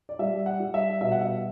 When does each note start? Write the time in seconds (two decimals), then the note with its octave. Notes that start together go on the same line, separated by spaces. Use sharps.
0.09 D5
0.19 G3 E5
0.46 F#5
0.60 G3
0.74 E5
1.01 B2 E5
1.11 F#5
1.21 E5